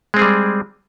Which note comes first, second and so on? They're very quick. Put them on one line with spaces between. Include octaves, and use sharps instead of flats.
G#3 C4 G#4 G3